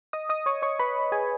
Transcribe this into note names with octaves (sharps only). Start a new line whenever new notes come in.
D#5 D#6
D#5 D#6
C#5 C#6
C#5 C#6
B4 B5
G#4 G#5